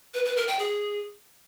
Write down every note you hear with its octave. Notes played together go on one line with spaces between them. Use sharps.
B4
B4
A#4
G5
G#4